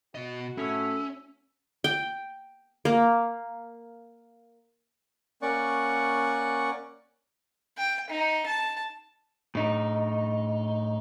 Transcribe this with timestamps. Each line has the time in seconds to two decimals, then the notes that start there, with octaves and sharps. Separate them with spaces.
0.15 B2 F#4 D#5
0.58 A2 A3 C#4 E4 E5
1.84 G5
2.85 A#3
5.42 A#3 C#4 D5 F#5 C#6
7.78 G5
8.10 D#4
8.46 A5
9.55 A2 D#4